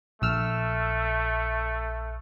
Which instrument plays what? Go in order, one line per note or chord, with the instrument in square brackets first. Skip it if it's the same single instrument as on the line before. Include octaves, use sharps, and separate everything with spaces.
[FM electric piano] A#1 E6 F6 [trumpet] A3